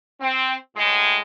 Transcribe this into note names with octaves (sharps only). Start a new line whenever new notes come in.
C4
A2 G#3